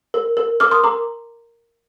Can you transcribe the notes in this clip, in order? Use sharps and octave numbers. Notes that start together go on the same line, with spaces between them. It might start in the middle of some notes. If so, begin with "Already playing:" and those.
A#4
A#4
A#4 D6 F6
C6 D#6
A#4 A#5 D6